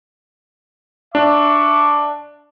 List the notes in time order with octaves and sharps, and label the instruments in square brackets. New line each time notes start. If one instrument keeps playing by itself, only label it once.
[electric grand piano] D4 [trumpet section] E5 C#6 D6